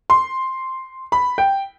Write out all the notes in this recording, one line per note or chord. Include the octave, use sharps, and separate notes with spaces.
C6
B5
G5